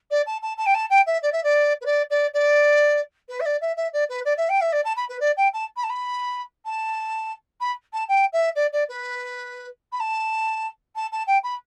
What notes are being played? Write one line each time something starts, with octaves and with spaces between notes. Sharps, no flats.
D5
A5
A5
A5
G5
A5
G5
E5
D5
E5
D5
B4
D5
D5
D5
B4
E5
D5
E5
E5
D5
B4
D5
E5
G5
E5
D5
A5
B5
B4
D5
G5
A5
B5
A5
B5
A5
B5
A5
G5
E5
D5
D5
B4
B5
A5
A5
A5
G5
B5